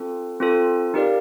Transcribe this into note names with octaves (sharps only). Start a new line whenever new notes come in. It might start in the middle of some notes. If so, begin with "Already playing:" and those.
Already playing: C4 F4 A4
C4 F4 A4
D#4 G4 A#4 D5 F5